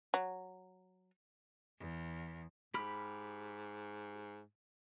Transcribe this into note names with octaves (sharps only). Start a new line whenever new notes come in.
F#3
E2
G#2 G4 B5 F6